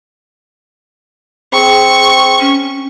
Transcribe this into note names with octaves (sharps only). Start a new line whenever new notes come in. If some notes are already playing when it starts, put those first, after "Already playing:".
C4 G#4 C#6
C#4